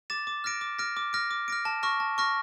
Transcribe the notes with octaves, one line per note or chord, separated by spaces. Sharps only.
D6 A6 E7
D6
F6 A#6 D7
D6
F6 A#6 D7
D6
F6 A#6 D7
D6
F6 A#6 D7
A5
C#6 F6 A#6
A5
C#6 F6 A#6